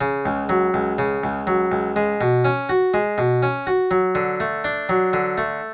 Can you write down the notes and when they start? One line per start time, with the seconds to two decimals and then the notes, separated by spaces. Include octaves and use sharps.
0.01 C#3
0.26 C#2
0.49 F#3
0.74 C#2
0.98 C#3
1.24 C#2
1.47 F#3
1.72 C#2
1.96 G#3
2.21 B2
2.45 C#4
2.69 F#4
2.94 G#3
3.18 B2
3.43 C#4
3.67 F#4
3.91 F#3
4.15 D3
4.40 A3
4.64 D4
4.89 F#3
5.13 D3
5.38 A3